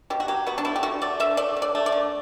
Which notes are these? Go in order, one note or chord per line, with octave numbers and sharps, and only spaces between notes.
B2 G4
F#4
F#3 G4
B3 F#4
D4
A3 E4
G4
D3 F#4
A3 D5
D3 E5
A3 D5
D3
D5
A3
D5
D3